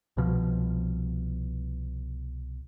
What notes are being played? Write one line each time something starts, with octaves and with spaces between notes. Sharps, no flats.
C2 B2 F3